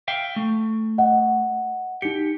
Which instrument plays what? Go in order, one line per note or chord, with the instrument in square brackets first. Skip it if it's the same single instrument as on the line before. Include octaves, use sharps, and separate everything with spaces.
[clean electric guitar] E5 F5 G5
A3
[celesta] D#5 F#5
[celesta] D#4 C#7 [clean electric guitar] G4